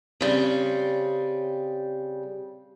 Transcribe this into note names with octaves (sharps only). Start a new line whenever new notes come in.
C#3 G3 C4